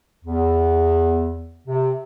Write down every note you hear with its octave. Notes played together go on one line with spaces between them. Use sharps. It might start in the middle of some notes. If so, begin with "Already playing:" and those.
E2
C3